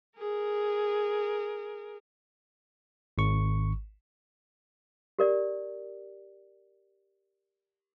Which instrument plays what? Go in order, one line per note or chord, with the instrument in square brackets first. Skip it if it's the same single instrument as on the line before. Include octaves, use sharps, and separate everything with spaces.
[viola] G#4 A#4
[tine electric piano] G#1 C#6
[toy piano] G4 A#4 D5